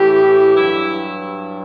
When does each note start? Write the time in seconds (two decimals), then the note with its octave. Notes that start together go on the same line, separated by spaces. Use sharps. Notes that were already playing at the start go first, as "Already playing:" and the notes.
Already playing: A2 E3 G4
0.54 G2 F#3 E4